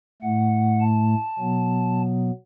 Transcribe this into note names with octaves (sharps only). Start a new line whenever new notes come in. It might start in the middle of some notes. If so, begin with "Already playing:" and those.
A2 A3 F#5
A5
B2 F#3 B3